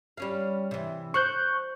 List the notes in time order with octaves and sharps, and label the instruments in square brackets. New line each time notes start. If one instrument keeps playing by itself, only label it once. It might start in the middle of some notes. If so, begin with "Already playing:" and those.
[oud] G3 C#4 F5
C3 E3
[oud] C5 [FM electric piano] C#6 F#6 G6